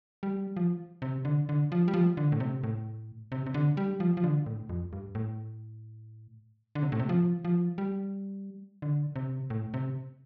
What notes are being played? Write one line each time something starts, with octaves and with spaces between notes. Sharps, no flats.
G3
F3
C3
D3
D3
F3
G3
F3
D3
A2
C3
A2
C3
C3
D3
G3
F3
F3
D3
A2
F2
G2
A2
D3
C3
A2
C3
F3
F3
G3
D3
C3
A2
C3